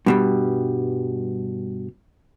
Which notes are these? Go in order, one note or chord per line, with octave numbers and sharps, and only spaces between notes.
G2 B2 G3